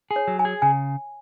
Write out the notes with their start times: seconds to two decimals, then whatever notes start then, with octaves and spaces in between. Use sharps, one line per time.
0.11 G#4
0.16 C#5
0.28 F#3
0.39 G#5
0.45 G#4
0.62 C#3 G#5